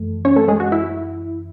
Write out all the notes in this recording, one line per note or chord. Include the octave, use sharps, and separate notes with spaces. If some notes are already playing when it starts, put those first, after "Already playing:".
Already playing: F#2 E3 A3
C#4 C#5
A3 A4
G#3 G#4
F#4
E4